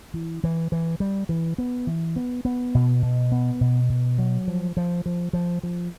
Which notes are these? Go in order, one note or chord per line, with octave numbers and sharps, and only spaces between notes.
E3
E3
E3
G3
E3
B3
E3
B3
B3
B2
B2
B3
B2
B2
F#3
F3
F3
F3
F3
F3